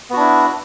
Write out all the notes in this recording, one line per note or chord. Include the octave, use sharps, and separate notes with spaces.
B3 D4 E4 F#4